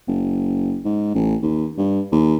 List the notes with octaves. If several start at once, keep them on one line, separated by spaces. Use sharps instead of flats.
F#1
G#2
A1
D#2
G2
D#2